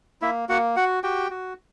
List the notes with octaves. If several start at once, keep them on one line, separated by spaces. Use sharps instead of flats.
A#3 E4 E5
A#3 F#4 F#5
F#4 F#5
F#4 G4 G5
F#4